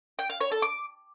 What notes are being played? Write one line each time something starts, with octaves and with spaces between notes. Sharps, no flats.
G5
F5
C#5
A4
D6